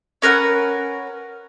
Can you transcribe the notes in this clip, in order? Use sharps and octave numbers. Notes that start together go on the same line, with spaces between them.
C#4 A#4 B4 F#5